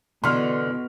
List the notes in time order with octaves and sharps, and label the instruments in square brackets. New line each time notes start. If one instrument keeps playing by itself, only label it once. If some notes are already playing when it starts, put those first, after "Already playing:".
[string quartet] B2 [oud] D3 E3 [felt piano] C6 F6